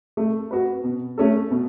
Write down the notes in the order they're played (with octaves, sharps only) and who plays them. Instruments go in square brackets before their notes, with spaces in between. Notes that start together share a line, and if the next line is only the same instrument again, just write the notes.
[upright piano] A3
F#4 B4
B2
A3 C#4 A4
B2